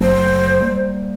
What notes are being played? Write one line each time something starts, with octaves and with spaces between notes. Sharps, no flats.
F#1 F#3 A3 C5
G3 A#3